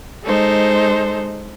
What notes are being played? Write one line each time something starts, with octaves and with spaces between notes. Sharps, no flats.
G#3 D#4 A4 C5